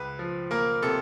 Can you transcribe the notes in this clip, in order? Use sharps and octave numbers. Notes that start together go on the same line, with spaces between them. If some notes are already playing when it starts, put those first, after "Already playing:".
Already playing: C#2 B4
F3
A#3 A#4
C3 A4